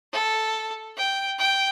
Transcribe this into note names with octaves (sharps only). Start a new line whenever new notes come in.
A4
G5
G5